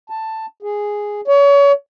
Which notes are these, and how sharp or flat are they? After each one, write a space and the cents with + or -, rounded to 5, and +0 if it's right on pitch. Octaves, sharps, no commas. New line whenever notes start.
A5 +10
G#4 -5
C#5 +30